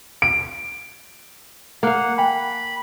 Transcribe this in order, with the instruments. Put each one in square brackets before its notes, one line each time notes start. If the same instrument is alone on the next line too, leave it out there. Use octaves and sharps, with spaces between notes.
[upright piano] D7
[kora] A#3 F5 [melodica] F#5
[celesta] G5 G#5 [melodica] B5